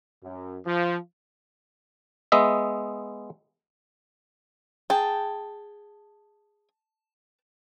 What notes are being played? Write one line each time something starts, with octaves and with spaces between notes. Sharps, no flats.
F#2
F3
G#3 B3 D#5 E5
G#4 G5 A5